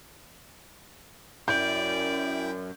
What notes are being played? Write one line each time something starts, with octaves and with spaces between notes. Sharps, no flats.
F#2 E4 D5 G5 G6